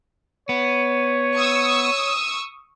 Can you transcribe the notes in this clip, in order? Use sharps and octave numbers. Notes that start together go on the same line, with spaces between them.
B3 C#5
C#6 D#6 E6